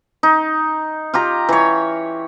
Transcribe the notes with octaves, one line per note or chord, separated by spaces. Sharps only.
D#4
F4 G4 A#5
E3 C#5